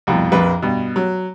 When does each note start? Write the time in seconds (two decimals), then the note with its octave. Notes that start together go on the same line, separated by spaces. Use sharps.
0.07 C2 F2 B2
0.32 A#1 F2 B4
0.62 G2 B2
0.96 F#3